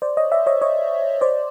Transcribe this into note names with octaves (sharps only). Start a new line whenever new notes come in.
C5 D5
C#5 D#5
D5 E5
C#5 D#5
C#5 D#5
C5 D5